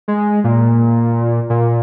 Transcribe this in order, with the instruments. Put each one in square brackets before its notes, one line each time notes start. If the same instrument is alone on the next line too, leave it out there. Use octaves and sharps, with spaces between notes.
[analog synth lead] G#3
A#2
A#2